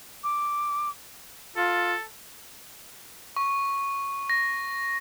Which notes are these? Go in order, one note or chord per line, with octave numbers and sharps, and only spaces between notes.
D6
F4 A4
C#6
A#6